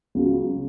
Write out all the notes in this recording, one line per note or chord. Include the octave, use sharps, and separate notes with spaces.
C#2 C#3 F#3